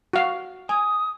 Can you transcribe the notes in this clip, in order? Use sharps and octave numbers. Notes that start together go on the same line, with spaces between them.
F#4 F5
G#5 D#6